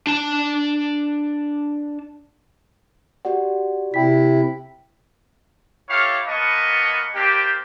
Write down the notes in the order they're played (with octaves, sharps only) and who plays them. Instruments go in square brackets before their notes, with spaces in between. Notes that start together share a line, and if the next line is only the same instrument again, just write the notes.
[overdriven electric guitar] D4 A5
[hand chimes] F#4 G4 D5 [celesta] F#5
[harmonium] C3 E4 [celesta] G5 B6
[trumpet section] E4 G4 A4 C#5 F5
A#3 B3 B4 D#5 A5 C#6
A#3 C4 D4 G4